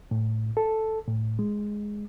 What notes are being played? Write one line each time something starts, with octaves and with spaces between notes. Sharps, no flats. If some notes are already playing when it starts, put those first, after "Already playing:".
A2
A4
A2
G#3